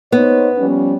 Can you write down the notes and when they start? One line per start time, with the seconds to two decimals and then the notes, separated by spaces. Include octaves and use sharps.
0.12 B3 D#4 C5 C#5
0.58 F3 G3 C#4